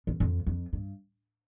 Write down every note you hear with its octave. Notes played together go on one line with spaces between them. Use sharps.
E2
F2
F2
G2